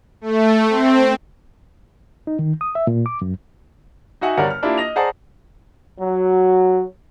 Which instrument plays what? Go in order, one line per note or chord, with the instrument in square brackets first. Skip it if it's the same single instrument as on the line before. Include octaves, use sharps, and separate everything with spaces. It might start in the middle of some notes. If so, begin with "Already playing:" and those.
[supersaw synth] A3
C4
[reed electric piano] D#4
D#3
D#6
E5
A#2
D6
F#2
[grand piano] D#4 F#4 E5 F#5 G#5
G1 G3 A#4 C#5 D5 F#5
F6
A#3 D4 E4 F4 G4
D#5 A#6 F7
G#4 C5 D5 F#5 A5 A#5
[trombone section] F#3